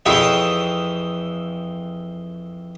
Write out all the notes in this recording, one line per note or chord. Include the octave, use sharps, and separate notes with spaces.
F2 E3 E4 G#4 C#5 G5